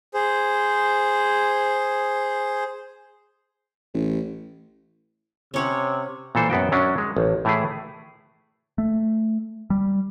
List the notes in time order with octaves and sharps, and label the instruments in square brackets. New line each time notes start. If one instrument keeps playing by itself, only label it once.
[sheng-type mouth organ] G#4 C5
[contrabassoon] A1
[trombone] C3 [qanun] C#4 C#5 F#5
[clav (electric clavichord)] A#2 E3 A4 C5
F#2 B3 F#4 G5
F#2 F#3 C#4 D4
G#3
A1
A2 E3 A3 E4 G#4
[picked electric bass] A3
G3